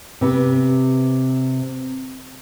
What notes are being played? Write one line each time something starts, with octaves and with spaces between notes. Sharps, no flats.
C3 B4